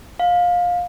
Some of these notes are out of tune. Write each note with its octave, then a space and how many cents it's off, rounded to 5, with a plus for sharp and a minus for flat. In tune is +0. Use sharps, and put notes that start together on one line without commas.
F5 +20